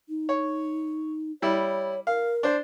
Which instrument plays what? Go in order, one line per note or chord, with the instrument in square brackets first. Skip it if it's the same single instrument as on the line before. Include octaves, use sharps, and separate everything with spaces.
[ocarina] D#4
[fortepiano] C#5
[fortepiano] G3 E4 [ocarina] C#5
[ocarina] A#4 [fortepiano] F5
[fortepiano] D4 C5